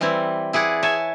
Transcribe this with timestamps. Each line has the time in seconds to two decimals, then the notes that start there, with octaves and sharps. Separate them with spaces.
0.01 E3 G3 C4 E4
0.53 E4 G#4 D5 F#5
0.83 C#5 E5 G#5 A5